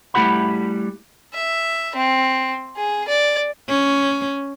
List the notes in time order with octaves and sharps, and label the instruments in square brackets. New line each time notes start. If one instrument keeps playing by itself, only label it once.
[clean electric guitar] G3 A3 E4 G4 F#5 B5
[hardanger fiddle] E5
C4
G#4
D5
[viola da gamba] C#4